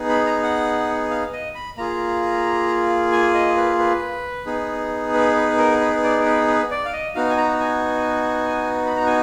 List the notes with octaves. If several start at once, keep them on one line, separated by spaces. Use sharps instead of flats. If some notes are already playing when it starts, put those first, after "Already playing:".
Already playing: B3 D#4 G#4
B5
A#5
F#5
F5
D#5
B5
A#3 F4 G#4 A#5
G#5
D#5
B4
B4
B3 D#4 G#4
B4
B4
A#4
B4
D5
B4
B4
D5
F5
D#5
B3 D#4 F#4 F5
G#5
A#5
G#5
B5
A#5
G#5